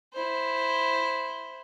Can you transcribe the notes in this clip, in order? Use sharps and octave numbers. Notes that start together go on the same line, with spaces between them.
E4 C5